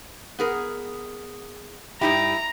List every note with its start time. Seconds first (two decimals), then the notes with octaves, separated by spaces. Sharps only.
0.39 B3 G#4 A#4
2.01 G2 D#4 E4 G4 A#5